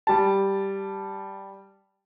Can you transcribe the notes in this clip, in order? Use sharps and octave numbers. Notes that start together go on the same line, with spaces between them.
G3 A5